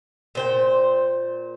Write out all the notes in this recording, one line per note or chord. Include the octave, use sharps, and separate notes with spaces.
A#2 C5 G5